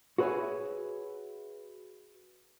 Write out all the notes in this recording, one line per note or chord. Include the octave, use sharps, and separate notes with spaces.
F#4 G#4 B4 C#5 E5 G#5